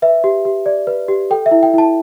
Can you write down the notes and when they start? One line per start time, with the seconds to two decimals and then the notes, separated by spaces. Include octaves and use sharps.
0.02 B4 E5
0.24 G4
0.45 G4
0.66 D5
0.87 B4
1.08 G4
1.30 A4 G5
1.46 E5
1.51 E4
1.63 G5
1.73 E4 A5